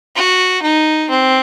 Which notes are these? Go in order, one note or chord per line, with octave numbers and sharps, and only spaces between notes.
F#4
D#4
C4